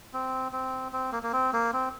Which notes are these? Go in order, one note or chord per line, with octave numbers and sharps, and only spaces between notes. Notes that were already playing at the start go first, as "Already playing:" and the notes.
C4
C4
C4
A#3
A#3
C4
A#3
C4